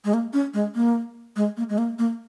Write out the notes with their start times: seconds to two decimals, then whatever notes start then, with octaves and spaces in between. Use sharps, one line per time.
0.05 G#3
0.14 A#3
0.33 C#4
0.54 G#3
0.75 A#3
1.36 G#3
1.57 A#3
1.69 G#3
1.78 A#3
1.99 A#3